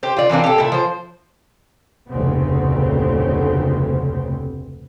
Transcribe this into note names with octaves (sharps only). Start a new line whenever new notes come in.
G4 C5
F4 D5
E3 A#3 C4 D4
G4 A4
A#2 E4
F3 C5
F1 D2 A#2 C#3 B3 C4